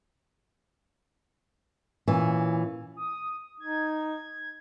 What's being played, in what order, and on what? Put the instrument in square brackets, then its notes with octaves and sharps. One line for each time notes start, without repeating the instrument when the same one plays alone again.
[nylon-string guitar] A#2 E3 C#4
[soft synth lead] D#6
[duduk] D#4 [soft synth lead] G#6